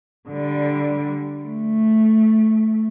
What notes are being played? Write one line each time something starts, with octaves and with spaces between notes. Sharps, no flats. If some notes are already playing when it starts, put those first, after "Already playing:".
D3 G3
A3